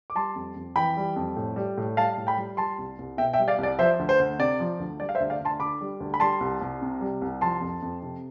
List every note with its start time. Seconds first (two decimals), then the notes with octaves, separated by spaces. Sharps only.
0.10 D6
0.15 G3 A5 C6
0.35 F2
0.56 F2
0.76 E3 G5 B5
0.97 G3
1.16 F2
1.37 A2
1.56 G3
1.77 A2
1.97 G3 F5 A5
2.17 A2
2.27 G5 B5
2.37 G3
2.57 G3 A5 C6
2.78 C2
2.98 C2
3.17 B2 E5 G5
3.33 E5 G5
3.38 G3
3.48 D5 F5
3.58 C2
3.63 D5
3.79 F3 C5 E5
3.99 D2
4.09 C5
4.19 D2
4.39 C3 D5
4.60 F3
4.80 D2
5.00 G3 D5
5.09 F5
5.15 C5 E5
5.20 D2
5.30 D5 F5
5.40 D2 A5 C6
5.60 D3 B5 D6
5.81 G3
6.00 D2
6.14 B5
6.20 G3 A5 C6
6.40 C2
6.61 C2
6.82 C3
7.01 G3
7.21 C2
7.41 F3 A5 C6
7.61 F2
7.82 F2
8.02 C3